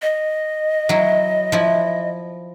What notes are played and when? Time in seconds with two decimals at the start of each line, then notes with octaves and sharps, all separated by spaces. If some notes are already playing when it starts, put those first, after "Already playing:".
0.02 D#5
0.89 F#3 E4
1.52 F3 E4